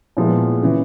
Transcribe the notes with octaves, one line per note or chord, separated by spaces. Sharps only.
A#2 F3 G#3 B3 E4
C#3 E3